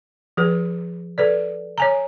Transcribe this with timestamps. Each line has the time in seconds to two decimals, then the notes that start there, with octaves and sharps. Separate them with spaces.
0.37 F3 G#4 B4
1.18 A4 B4 D5
1.78 C#5 G#5 A#5